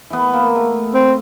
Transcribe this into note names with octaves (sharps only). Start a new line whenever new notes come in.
E3 B3
A#3
A3
C4